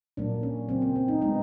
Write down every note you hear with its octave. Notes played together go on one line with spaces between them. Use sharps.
A#2 F#3 A#3 D4
C#4
C#3 F#3 A#3 C4
C4
C4
D#4
B2 G#3 B3 D#4